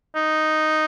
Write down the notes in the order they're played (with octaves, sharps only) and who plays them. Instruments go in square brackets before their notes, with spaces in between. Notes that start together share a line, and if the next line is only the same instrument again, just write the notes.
[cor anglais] D#4